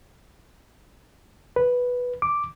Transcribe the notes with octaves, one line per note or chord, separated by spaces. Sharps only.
B4
D6